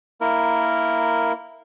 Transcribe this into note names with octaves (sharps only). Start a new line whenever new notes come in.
A#3 E4 A#4